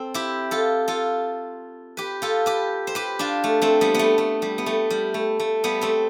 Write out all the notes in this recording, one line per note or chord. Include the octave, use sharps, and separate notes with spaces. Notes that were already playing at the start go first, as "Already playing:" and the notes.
Already playing: C4 A4
E4 G4
F4 A4
F4 A4
G4 B4
F4 A4
G4 B4
C5
G4 B4
D4 F4
A3
A3 C4
G3 B3
A3 B3
A3
G3
B3
A3
G3
A3
A3
G3 B3
A3 C4